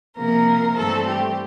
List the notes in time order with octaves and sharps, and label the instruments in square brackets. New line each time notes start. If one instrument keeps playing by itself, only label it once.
[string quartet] C3 F3 A#3 A#4
G2 E3 A3 C4 A4
G4